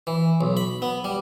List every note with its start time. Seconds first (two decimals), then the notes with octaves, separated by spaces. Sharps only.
0.07 E3
0.41 B1
0.57 B5
0.82 B3
1.04 G3